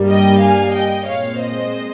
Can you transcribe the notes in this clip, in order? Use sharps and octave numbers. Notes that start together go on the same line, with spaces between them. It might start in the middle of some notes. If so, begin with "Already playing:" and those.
Already playing: G2 G3 A#3
D#5 G5
F5 G#5
D#5 G5
A#2 G#3 C4 C#5 F5
C5 D#5